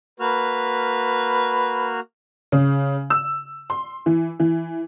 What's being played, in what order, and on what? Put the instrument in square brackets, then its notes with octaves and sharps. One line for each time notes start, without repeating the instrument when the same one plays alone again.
[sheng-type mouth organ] A#3 F#4 F6 [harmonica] B4
[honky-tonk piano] C#3
E6
C6
E3
E3